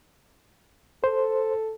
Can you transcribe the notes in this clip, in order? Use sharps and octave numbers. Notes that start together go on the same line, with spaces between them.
A4 C5